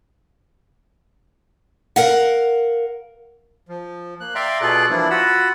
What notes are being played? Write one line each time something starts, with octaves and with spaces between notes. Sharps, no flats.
A#4 F5 F#5
F3
A#3 F#6
D5 E5 F5 G5 A#5 C6
B2 F4 G#4 A4 D5 F#6
E3 F3 G3 A#3 D4 E4
F4 F#4 F#5 B5 E6